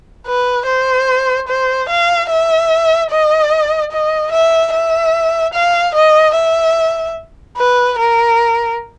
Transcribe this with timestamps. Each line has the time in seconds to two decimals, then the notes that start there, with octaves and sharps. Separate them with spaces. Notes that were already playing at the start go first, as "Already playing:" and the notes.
0.26 B4
0.67 C5
1.48 C5
1.89 F5
2.30 E5
3.11 D#5
3.92 D#5
4.32 E5
4.73 E5
5.54 F5
5.95 D#5
6.35 E5
7.57 B4
7.98 A#4